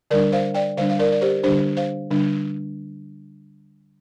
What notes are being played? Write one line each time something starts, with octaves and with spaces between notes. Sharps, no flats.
D3 G3 D4 A#4 D5
C5 F5
D5 G5
D3 G3 D4 C5 F5
F5
A#4 D5
D5
G4 C5
D3 G3 D4 G4 C5
C5 F5
D3 G3 D4